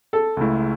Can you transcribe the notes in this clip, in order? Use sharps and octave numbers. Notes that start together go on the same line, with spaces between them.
A4
C#2 C#3 A3 E4